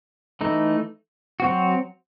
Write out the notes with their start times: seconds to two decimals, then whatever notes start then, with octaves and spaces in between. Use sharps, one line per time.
0.41 E3 A3 D#4
1.40 F#3 C4 F#4